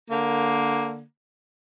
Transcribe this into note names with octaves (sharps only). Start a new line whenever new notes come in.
D3 A#3